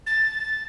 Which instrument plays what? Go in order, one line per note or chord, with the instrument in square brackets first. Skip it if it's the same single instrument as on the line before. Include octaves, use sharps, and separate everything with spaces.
[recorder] A6